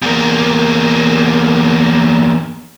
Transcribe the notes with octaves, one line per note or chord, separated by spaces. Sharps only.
E2 A#3